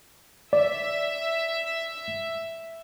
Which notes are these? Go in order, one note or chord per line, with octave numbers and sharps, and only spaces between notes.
D5 E5